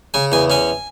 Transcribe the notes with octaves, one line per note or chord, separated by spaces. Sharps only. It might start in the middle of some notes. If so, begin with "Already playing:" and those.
C#3 G#5
E2 G#5
C#4 G#5